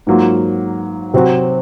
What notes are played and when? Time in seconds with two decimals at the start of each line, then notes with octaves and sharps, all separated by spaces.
0.07 G#2 F#3 A#3 F4
1.14 C3 F#3 C4 F#4